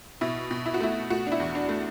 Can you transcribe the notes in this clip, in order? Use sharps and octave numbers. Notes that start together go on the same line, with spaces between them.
B2 E4
B2
E4
F#4
A3 E4
A3 F#4
D4
E4
E2
D4
A3